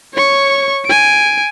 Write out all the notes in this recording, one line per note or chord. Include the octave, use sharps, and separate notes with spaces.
C#5 C#6
G#5 D7